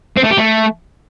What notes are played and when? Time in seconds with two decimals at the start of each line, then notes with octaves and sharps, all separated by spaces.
0.17 C4
0.24 A3
0.31 G4
0.38 A3